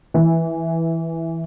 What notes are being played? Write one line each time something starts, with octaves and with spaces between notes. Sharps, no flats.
E3